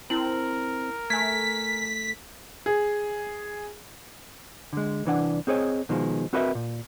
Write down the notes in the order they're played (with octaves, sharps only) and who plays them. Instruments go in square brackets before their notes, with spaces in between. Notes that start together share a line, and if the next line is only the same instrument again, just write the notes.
[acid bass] C4 [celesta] E4 F#7 [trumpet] A#4
[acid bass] A3 [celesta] G#5 G#6 [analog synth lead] B6
[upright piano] G#4
[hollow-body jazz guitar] D3 G#3
C2 E3 D4 F#5
C4 G#4 C#5 D#5
B2 D#3 F3 G#3
C4 F#4 A#4 B4 D#5 E5
A#2